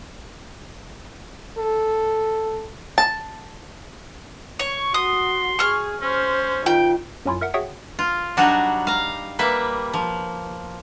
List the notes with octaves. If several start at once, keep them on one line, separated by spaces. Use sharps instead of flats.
A4
A5
C#5 C#6
F#4 C6 D#6
G#4 C#6 F6
C#4 C5
D#3 F4 G5
F#2 F#3 C#4 E4 F4
A#4 E5 F#5
F#4 G#4 C#5 E5 F#5 G5
F4
F#3 G3 D4 D#4 F#4
F5 A#5
G3 A#3 B4 E5
F3